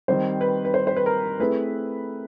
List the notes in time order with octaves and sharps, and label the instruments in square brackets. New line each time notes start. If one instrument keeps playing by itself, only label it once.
[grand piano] D#3 G3 C4 [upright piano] C5
[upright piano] B4
B4
C5
C5
B4
A#4
[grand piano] A3 C4 E4 G#4 [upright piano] B4